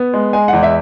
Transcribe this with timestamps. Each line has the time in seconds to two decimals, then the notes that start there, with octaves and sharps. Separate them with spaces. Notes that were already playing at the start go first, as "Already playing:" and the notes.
Already playing: B3
0.13 G#3
0.33 G#3 G#5
0.48 F#5
0.53 E2
0.63 E5